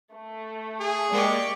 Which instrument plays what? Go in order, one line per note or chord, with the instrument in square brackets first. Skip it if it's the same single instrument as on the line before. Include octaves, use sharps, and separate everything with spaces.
[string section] A3
[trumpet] G#4
[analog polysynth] G#3 A#3 [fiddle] G4 C#6 [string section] D5